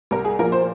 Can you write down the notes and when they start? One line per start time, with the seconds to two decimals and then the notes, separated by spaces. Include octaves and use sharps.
0.11 C2 A#4
0.25 G#4
0.39 A#2 F3 A#3 A#4
0.52 C5